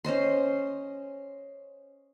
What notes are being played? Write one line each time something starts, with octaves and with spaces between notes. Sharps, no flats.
C#4 C5 D#5 C6